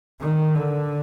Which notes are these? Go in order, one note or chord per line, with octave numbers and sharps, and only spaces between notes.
D#3
D3